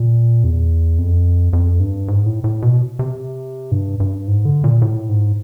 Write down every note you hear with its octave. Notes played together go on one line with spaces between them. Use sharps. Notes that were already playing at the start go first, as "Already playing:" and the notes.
Already playing: A#2
E2
F2
F2
G2
G#2
A2
A2
B2
C3
G2
G2
G#2
D3
A#2
A2
G#2